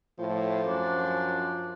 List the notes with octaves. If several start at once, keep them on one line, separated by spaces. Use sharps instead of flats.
A2 F3
F#2 D4